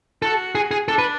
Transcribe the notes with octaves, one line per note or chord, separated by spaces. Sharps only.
F#4 A4
G#4
G#4
D4 A4
B4